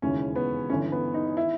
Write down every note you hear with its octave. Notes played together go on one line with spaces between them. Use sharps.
E1 D#2 C#3 E3 C#4
B3
G1 G2 E3 C#4
B3
D#4
D#3 E4